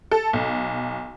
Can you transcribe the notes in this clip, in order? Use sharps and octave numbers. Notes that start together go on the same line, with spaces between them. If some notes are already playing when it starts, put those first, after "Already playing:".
A4
B1